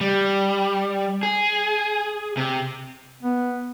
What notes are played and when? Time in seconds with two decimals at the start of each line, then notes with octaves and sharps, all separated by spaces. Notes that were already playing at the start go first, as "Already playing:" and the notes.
0.01 G3
1.23 G#4
2.37 C3
3.23 B3